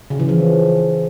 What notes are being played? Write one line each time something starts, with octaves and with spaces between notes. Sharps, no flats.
C#3
E3
F3